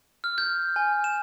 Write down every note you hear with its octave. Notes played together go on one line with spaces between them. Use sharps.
F6
G6
G#5
E7